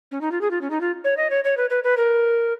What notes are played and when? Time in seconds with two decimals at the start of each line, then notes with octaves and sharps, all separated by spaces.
0.11 C#4
0.21 D#4
0.31 F4
0.41 G#4
0.51 F4
0.61 C#4
0.70 D#4
0.81 F4
1.04 C#5
1.17 D#5
1.30 C#5
1.44 C#5
1.57 B4
1.70 B4
1.84 B4
1.97 A#4